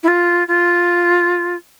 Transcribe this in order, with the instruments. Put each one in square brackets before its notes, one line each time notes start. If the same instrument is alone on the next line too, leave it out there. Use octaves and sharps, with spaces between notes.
[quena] E4
F4
F4